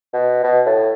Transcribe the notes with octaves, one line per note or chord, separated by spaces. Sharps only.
B2
B2
A2